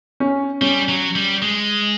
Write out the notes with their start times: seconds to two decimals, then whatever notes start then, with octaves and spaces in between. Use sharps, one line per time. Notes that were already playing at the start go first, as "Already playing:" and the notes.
0.20 C#4
0.61 G3 C#4
0.89 F#3
1.16 G3
1.42 G#3